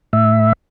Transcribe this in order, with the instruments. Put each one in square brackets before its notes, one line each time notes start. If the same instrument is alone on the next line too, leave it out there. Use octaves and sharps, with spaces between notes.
[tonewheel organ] A2 E5